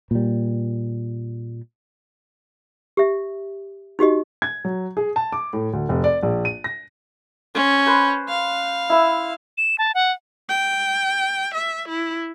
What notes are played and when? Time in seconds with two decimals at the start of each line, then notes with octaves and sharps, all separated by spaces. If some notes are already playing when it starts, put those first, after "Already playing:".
0.11 A#2 G3
2.97 G4 E5
3.99 D#4 F#4 G4 D#5
4.42 G#6
4.65 F#3
4.97 G#4
5.16 A5
5.32 D6
5.53 A2
5.73 D2
5.89 F1
6.04 D5
6.23 A#1
6.45 D#7
6.64 A#6
7.55 C#4 C5
7.87 B4 C5
8.29 F5
8.90 E4 E5
9.58 E7
9.78 A5
9.95 F#5
10.49 G5
11.55 E5
11.89 E4